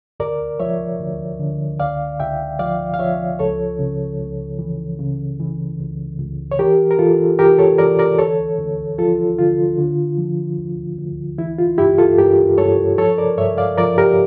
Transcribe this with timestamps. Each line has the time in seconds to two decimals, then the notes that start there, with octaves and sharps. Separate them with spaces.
0.20 D2 A#4 D5
0.60 F3 C#5 E5
1.00 D2
1.39 D3
1.79 C#2 D5 F5
2.20 C#2 E5 G5
2.59 F3 D5 F5
2.94 F5
2.99 F3 C#5 E5
3.39 C#2 A4 C#5
3.79 C#3
4.19 C#2
4.59 E3
4.99 C#3
5.40 E3
5.79 C#2
6.19 C#2
6.52 C#5
6.59 E3 G4 A#4
6.91 A#4
6.99 E3 F4 A4
7.39 E3 G4 A#4
7.58 A4 C#5
7.79 E3 A#4 D5
7.99 A#4 D5
8.19 D2 A4 C#5
8.58 D2
8.98 F3 F4 A4
9.39 D3 F4
9.78 D3
10.18 F3
10.58 D2
10.98 D2
11.38 E3 E4
11.58 F4
11.78 G2 E4 G4
11.98 F4 A4
12.18 G2 G4 A#4
12.58 G2 A4 C#5
12.98 F3 A4 C#5
13.18 A#4 D5
13.38 G2 C#5 E5
13.58 D5 F5
13.78 F3 A#4 D5
13.98 G4 A#4